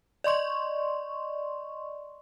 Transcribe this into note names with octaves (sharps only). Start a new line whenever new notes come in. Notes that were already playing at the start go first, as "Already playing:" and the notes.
D5 D#5 C6 C#6